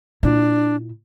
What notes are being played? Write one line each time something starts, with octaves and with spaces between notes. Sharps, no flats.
A#2 D4 E4